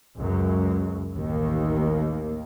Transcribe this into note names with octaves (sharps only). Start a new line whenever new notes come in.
C#2 F#2
A1 D#2 D#3 A#3